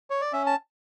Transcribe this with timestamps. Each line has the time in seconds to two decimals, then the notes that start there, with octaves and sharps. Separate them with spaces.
0.10 C#5
0.21 D5
0.33 C#4 E5
0.46 A5